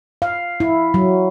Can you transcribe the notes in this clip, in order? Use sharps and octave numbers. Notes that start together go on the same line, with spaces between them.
F5
E4
F#3